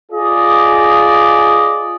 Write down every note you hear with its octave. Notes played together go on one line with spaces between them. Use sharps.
F4 G#4 D5 D#5